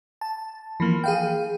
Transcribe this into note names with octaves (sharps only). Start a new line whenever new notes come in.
A5
E3 F3 A#3
G#4 F5 G5